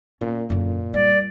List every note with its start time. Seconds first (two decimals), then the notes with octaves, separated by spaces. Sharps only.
0.21 A#2 C#4
0.50 F#2 A#2 D3
0.94 G3 D5